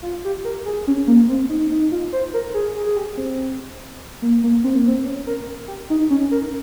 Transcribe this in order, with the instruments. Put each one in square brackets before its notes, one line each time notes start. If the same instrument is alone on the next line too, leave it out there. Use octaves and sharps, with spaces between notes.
[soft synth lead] F4
G4
A#4
G#4
C#4
A#3
C4
D#4
D#4
F4
C5
A#4
G#4
G#4
G#4
G4
C4
A#3
A#3
C4
A#3
C4
C#4
A#4
G4
D#4
C#4
A#4